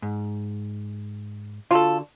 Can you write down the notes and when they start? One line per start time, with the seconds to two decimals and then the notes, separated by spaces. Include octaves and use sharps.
0.02 G#2
1.71 D3 F4 F#4 A4 A5